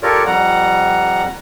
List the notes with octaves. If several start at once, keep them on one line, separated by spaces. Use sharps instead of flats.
F4 G4 A4 A#4 C#5 D5
F2 G3 F#5 A#5